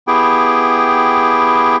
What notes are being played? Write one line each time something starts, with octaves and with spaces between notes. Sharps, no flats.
B3 E4 G4 G#4 G5